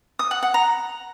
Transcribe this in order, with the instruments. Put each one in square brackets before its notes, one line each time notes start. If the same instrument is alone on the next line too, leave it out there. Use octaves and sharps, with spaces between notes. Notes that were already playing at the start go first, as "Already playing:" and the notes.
[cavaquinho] D#6
F#5
F#5
A#5